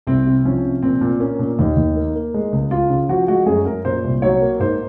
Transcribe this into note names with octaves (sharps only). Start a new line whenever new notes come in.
C2 C4
C3
F3 C#4
C3
A#2 C4
A#2
A#3 C#4
A#2
D#2 D#4
D#2
A#3
A#3
G#3
C#2
C#2 F4
C#3
F3 F#4
G#3 F#4
F#2 G#4
F#2 A#4
A#2 C5
C2
F#3 C#5
A#3
G#2 C5